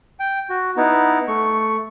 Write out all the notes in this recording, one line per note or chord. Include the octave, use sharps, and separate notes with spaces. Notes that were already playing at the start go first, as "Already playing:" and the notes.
G5
F#4
B3 D#4 E4
A3 C#6